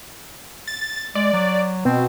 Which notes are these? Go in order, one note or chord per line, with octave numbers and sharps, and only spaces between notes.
A6
G#3 D5
F#3
B2 C4